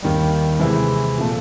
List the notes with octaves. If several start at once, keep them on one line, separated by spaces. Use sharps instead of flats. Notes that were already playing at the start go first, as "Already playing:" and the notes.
D#2 D#3 G3
C3 E3 G#3 C4 E4
A#2 F3 A3